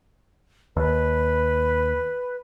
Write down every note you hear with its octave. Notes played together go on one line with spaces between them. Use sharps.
D#2 B4